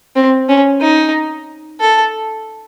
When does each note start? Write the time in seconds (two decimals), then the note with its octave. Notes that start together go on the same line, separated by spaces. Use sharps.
0.16 C4
0.49 C#4
0.81 D#4
1.80 A4